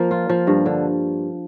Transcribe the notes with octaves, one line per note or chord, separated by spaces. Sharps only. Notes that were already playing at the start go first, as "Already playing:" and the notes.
Already playing: F3 A#3
F4
F3
G2
D3